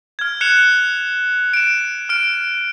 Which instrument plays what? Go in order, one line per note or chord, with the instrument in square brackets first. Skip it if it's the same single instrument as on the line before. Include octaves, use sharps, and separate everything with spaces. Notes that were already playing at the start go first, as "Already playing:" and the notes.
[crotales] F6 G#6
F#6 C#7 E7 F7
D7 E7
F6 D7